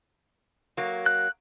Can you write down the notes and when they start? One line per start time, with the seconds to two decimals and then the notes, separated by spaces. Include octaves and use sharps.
0.77 F#3 A#3
1.06 F#6